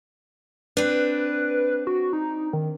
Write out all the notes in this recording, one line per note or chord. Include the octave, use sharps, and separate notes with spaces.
C4 D4 B4
F#4
D#4
D#3